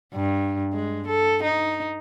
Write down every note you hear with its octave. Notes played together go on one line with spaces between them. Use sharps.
G2
G#3
A4
D#4